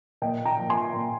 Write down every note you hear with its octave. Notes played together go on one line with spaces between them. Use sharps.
A#2 D#5 G5
G5 A#5
F3
G#5 C6
A#2